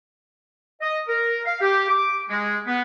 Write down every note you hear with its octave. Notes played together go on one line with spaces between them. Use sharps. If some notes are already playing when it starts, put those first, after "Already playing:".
D#5
A#4
F5
G4
D6
G#3
B3